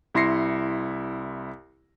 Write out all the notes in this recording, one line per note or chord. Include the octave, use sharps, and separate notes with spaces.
C2 E4 C6 A#6 C7 C#7